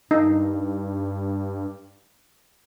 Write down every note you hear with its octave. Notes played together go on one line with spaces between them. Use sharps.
G2 D#4